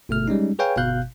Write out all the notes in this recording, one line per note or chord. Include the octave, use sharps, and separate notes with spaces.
G1 B2 A3 F6
G3 G#3 C#4 D#4
G#4 B4 C#5 F5 G5 G#5
G1 B2 F5 F#6 G6